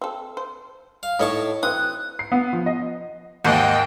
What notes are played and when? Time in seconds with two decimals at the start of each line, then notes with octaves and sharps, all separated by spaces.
0.01 C4 A4
0.37 C5
1.03 F5
1.20 A2 D#4 A4 C#5 D#5 A5
1.63 E3 F#3 C4 D#6 F#6
2.19 C7
2.32 B3
2.53 F3
2.66 D#5
3.44 D#2 G#2 A#3 D#5 F#5 G5